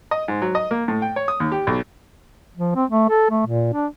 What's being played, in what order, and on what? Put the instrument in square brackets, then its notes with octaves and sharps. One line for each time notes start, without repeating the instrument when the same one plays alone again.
[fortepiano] D#5
G#2
F#3
D#5
A#3
A2
G5
C#5
D#6
D#2
G4
B1
[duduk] F3
C4
A3
A4
A3
A#2
D4